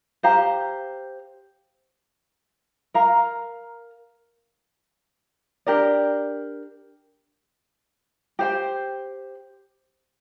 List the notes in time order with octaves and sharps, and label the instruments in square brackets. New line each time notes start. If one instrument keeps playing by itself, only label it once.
[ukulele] G4 C5 F5 A#5
A#4 F5 A#5
D4 G4 A#4 D5
G4 C5 G5